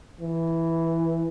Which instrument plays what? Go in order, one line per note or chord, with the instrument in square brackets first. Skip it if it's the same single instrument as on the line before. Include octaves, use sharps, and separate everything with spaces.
[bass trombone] E3